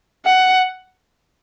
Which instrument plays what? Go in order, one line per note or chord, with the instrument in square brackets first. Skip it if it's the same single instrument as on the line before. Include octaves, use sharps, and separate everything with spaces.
[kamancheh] F#5